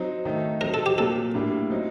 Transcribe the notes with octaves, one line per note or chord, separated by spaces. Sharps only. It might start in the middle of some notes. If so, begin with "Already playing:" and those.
Already playing: F#3 C4 D#4
D#3 A3 D#4
F#3 C4 D#4 A#4
A4
G4
A#2 F#3 A#3 A4
A2 G3 A#3 D4
F#3 C4 D#4